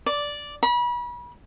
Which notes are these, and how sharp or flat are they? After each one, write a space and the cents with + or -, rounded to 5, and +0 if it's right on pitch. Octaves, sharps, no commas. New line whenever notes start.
D5 -5
B5 -35